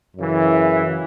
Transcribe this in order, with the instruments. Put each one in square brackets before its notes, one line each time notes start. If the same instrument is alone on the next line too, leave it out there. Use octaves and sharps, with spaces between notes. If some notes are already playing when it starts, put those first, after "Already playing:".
[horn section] F#2 C#3 E3